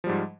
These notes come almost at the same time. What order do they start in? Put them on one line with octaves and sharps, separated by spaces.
F3 G3 G#2